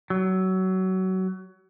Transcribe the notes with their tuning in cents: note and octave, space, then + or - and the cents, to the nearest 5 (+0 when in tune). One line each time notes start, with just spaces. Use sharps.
F#3 +25